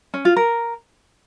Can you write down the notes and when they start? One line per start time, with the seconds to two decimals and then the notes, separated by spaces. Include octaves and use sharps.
0.14 C#4
0.25 F4
0.36 A#4